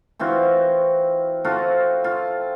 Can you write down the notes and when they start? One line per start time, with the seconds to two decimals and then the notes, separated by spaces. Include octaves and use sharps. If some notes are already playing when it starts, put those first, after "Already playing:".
0.19 E3 C4 F4 F#4
1.44 C4 F4 F#4 A4
2.04 F4